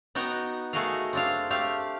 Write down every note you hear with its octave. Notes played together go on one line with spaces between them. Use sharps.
B3 D#4 F#4 G5 A#5
A3 F#4 G#4 A#4 D#5 F5
C4 D4 F5
A3 G4 F5